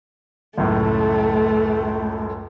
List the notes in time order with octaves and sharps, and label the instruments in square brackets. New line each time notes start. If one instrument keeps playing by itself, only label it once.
[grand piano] C#2 F#2 A2 [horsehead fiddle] A3